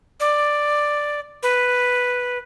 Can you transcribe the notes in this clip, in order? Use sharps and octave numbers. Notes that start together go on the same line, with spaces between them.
D5
B4